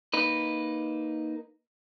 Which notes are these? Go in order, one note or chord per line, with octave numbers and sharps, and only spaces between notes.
A#3 D#4 B4